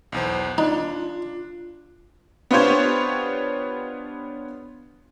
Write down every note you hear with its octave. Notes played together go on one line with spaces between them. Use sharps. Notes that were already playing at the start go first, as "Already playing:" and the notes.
B1 E2 C5
D4 D#4 F4
B3 D4 F4 G4 C5 C#5